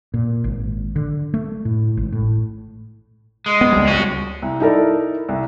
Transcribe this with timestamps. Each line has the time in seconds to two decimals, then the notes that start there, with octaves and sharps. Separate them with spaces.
0.14 A#2
0.44 G#1
0.96 D3
1.34 A3
1.65 A2
1.97 G#1
2.12 A2
3.46 G#3
3.61 B3
3.73 C#2 G3
3.87 C#4 F#4
4.42 C2
4.60 D#4 E4 A4 A#4 D5
5.29 C2